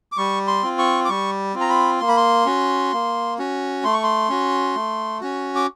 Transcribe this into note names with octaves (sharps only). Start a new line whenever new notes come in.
D6
G3 C#6
C6
C4 F4
C#6
D6
G3 C#6
C4 F4
A#5
B5
A#3 C6
B5
C6
C#4 F#4
A#3
C#4 F#4
A3 C6
C#6
C6
C#4 F#4
A3
C#4 F#4
D6